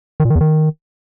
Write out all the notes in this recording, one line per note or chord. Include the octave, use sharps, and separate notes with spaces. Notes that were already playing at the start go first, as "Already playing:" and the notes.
D#3
A#2
D#3
E2
D#3